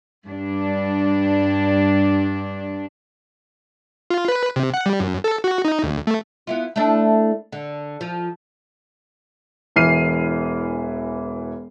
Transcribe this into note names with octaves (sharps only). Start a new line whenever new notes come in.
G2 D4
F4
B4
C3
F#5
G3
F#2
A4
F#4
D#4
D2
A3
B3 E4 F4
A3 D4 E4
D3
F3
E1 E3 F6 C7 D#7